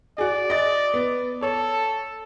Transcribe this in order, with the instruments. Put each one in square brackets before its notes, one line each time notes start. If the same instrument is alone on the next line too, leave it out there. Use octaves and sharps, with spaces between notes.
[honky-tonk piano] F#4 G#4 [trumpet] D5
[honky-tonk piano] D#5 A6
B3
[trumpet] A4 [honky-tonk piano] C#5